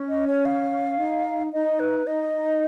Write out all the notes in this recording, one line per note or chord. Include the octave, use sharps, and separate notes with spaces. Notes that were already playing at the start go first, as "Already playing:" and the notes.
Already playing: C#4
D#5
C#5
F5
D#4
D#4 D#5
B4
D#4 D#5